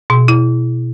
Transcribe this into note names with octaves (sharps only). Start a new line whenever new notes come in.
B2
E4